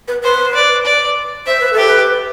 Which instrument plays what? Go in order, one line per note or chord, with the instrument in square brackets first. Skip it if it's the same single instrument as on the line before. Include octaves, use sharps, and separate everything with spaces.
[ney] B4
[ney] B4 [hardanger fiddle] C5
[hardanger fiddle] D5
D5
[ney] C5 [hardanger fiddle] E5
[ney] B4
[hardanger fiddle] G4 [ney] A4
[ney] B4